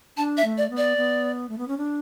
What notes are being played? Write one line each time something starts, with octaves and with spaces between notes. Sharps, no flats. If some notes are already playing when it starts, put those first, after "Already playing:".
D4 A5
E5
A3
D5
B3
D5
B3
A3
B3
C#4
D4